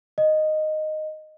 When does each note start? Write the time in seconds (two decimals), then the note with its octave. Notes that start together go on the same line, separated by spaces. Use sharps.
0.18 D#5